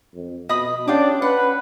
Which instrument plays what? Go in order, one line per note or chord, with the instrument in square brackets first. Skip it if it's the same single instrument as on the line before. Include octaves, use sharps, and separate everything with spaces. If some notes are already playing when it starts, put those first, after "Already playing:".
[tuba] F2
[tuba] B2 [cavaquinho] D#5 B5 D#6
[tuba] C#4 [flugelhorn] D4 [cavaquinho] F4 G4 D6
[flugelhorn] B4 [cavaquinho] F#5